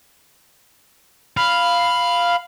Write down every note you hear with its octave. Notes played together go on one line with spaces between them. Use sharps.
F5 B5